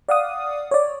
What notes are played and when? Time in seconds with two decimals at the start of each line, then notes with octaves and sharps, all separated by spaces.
0.09 D5 F5 F#5 D#6
0.71 C#5 D5